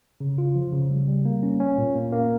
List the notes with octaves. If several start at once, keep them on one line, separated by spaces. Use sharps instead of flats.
C#3
F4
F3
C#3
G3
G3
A#3
C#4
C#4
A#2
A#3
A#3